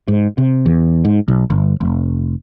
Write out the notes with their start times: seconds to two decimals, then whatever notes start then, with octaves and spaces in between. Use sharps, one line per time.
0.08 G#2
0.38 C3
0.66 E2
1.05 G#2
1.28 B1
1.50 G1
1.81 F1